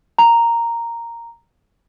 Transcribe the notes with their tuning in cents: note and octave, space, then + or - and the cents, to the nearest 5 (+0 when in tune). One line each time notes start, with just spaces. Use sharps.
A#5 -5